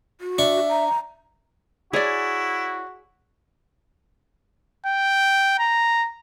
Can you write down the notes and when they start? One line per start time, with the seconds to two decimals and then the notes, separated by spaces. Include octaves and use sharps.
0.21 F#4
0.38 D4 E5 C#6
0.70 A#5
1.93 E4 F#4 G#4 C#5 D5
4.87 G5
5.59 A#5